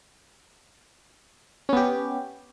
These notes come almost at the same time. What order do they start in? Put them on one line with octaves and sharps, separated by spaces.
C#4 B3 G4